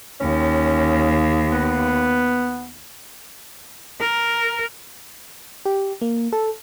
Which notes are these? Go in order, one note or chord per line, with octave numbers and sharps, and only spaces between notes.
D#2 C#4
B3
A#4
G4
A#3
A4